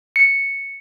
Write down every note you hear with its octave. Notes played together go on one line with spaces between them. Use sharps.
C#7